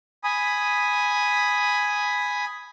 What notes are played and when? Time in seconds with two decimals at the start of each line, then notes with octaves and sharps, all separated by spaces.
0.24 G#5 B5 D#6